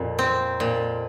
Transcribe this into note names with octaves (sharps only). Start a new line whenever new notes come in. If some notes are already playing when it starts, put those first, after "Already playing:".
Already playing: F2 A#2
C4
A#2